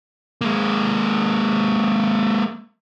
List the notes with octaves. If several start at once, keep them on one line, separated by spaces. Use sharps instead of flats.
G#3 A#3